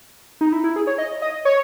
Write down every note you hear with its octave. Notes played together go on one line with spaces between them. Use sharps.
D#4
E4
E4
G#4
C#5
D#5
D#5
C#5